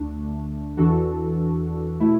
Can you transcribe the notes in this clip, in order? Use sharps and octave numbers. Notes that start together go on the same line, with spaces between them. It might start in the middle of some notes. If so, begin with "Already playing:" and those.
Already playing: D2 D3 A3 D4
E2 E3 D4 F#4 A4
B2 A3 E4